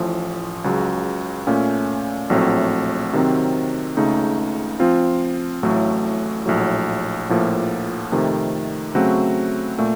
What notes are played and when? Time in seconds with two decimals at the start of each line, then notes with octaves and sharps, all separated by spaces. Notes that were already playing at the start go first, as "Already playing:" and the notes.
Already playing: A1 A2 F3
0.64 C#2 C#3 F#3
1.47 A#2 A3 C#4 A4
2.30 A#1 A2 F#3 A3 C4
3.13 C3 D#3 F#3 C4
3.97 C#2 C#3 A3 D#4
4.80 F3 C4 F4
5.63 A1 A2 F#3 A3
6.46 A#1 A2 F#3
7.29 A#1 A2 F3 A#3
8.12 F2 C3 D#3 A3
8.95 C#3 F#3 A3 C4 F#4
9.78 A#2 A3